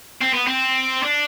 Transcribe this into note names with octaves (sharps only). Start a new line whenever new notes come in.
C4
B3
C4
D4